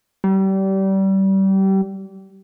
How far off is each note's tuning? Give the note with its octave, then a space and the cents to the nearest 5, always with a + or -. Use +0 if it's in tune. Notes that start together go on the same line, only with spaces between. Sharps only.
G3 -30